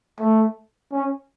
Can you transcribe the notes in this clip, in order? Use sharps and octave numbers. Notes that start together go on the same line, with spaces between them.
A3
C#4